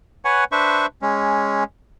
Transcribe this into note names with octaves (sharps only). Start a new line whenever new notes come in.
B4 C#5 F#5 G#5
D4 B4 C5 E5 C#6
G#3 C#4